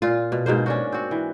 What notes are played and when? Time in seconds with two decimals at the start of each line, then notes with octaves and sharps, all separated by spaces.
0.02 A#2 F4
0.32 B2
0.46 G#2 B2 A#3 C5
0.66 C#4 D4 F#4
0.92 C4 F#4
1.11 E3